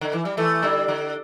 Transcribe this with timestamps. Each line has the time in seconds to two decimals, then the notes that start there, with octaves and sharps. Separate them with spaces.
0.01 D3
0.13 E3
0.25 G3
0.37 E3 A3
0.63 D3 G3
0.88 D3